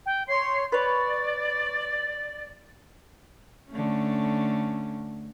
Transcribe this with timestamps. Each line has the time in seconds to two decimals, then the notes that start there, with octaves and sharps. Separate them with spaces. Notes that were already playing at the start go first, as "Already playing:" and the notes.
0.06 G5
0.28 C#5 C6 C7
0.72 B4 C#5 D5 A6
3.70 D3 A3 C#4